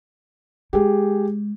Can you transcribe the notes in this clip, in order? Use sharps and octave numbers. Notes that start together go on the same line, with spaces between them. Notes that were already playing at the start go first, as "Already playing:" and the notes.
G#3 G4 G#4